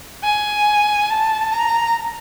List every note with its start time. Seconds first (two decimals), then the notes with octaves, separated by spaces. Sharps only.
0.23 G#5
1.09 A5
1.52 A#5